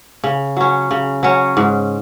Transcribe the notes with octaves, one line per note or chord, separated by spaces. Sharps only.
C#3
F#3 C#4
C#3
F#3 C#4
G#2